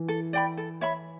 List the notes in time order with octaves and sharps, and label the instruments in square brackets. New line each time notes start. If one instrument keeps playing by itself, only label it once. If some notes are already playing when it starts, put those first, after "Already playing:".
Already playing: [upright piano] E3
[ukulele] A4
D5 G5 B5
A4
C#5 E5 B5